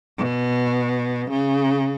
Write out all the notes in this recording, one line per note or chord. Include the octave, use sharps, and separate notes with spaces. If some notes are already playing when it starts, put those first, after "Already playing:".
B2
C#3